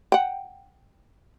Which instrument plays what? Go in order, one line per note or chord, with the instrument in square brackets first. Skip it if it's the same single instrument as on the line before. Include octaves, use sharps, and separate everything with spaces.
[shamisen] F#5 G5